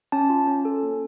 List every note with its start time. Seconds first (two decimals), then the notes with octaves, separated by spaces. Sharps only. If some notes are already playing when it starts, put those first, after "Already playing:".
0.12 C#4 A5
0.30 F4
0.47 C#4
0.65 A4
0.83 A#3